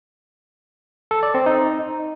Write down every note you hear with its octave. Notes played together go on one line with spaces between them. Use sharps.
A4
D5
C4
D#4